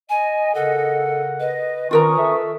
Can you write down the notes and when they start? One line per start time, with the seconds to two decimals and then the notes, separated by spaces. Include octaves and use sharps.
0.09 D#5 G#5
0.55 C#3 A4 A#4 F#5
1.40 B4 D#5
1.91 D#3 C#4 F4 A#4 A#5 C#6 D#6
2.17 A4 E5